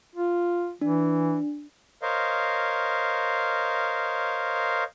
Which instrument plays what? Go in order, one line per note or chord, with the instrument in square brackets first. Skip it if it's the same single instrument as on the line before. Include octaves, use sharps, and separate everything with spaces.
[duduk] F4
[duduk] E3 [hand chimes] D4
[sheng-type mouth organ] A#4 C5 C#5 D#5 F5